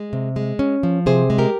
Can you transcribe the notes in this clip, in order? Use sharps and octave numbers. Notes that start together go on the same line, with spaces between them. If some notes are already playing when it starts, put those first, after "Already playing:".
Already playing: G#3
C3
G#3
C#4
F3
C3 G#4 C5
G#3
G4 A#4